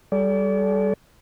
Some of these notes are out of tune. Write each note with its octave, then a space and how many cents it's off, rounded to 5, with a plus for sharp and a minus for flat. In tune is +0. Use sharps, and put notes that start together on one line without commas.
G3 +0 A4 -30 D5 -35